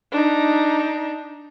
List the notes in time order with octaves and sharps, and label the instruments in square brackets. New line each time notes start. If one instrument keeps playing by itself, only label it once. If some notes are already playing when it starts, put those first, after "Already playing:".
[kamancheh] D4 D#4